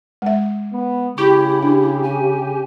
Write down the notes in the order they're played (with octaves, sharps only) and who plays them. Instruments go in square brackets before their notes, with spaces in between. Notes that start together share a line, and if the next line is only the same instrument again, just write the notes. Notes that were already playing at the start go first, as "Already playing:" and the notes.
[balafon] G#3 E5
[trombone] B3
[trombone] C#3 [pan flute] E4 [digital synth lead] G4 [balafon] C#6
[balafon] D4
[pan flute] G#5